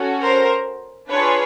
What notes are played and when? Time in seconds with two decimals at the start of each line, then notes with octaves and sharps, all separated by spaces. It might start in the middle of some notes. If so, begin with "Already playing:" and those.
Already playing: C#4 F#4 A4
0.21 A#4 C5
1.10 D4 F4 G#4 B4 C#5